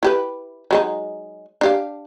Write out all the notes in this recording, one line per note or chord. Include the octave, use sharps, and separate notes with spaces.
E4 G4 B4
F#3 G#3 D#4
D4 G4 F5